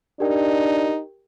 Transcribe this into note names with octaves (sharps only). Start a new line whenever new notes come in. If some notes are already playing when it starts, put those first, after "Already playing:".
D4 D#4 G4 A#4 G5